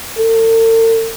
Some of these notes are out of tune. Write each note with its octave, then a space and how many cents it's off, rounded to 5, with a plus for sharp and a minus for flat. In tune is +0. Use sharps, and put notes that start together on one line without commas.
A4 +45